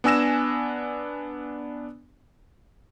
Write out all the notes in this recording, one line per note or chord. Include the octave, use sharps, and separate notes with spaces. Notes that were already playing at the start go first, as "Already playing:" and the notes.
B3 D4 G#5 E6 A#6 E7